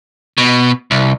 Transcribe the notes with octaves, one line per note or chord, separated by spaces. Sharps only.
B2
C2